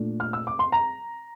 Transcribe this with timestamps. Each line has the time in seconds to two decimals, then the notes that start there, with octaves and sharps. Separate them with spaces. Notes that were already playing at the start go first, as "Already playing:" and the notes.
Already playing: A#2 A3 D4
0.20 F6
0.33 E6
0.47 D6
0.59 C6
0.72 A#5